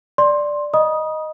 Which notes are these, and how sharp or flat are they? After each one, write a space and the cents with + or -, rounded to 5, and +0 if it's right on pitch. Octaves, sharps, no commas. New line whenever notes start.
D5 +0 C6 +15
D#5 +0 B5 -45 D#6 +0